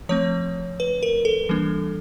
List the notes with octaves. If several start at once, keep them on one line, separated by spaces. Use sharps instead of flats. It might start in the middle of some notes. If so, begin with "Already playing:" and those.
F3 A3 C4 C#5
B4
A#4
A4
E3 G3 A#3 D4